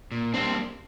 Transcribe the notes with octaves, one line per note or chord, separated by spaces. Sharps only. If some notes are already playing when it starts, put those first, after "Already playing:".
A#2
G3 A#3 C4 D4